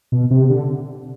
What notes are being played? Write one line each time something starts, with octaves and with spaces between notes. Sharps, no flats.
B2
C3
D3